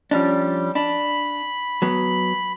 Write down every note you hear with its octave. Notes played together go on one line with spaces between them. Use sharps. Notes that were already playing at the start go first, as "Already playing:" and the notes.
F3 G3 C#4 D4
D4 B5
F#3 B3